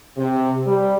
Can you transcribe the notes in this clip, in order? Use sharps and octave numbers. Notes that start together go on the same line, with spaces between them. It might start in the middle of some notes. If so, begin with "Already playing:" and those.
C3
G3